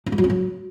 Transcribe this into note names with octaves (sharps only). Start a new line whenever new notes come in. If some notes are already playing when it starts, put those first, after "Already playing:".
D4
G3
F#3
C#4
F#3